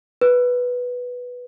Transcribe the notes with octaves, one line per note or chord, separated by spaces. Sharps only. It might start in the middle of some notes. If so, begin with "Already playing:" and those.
B4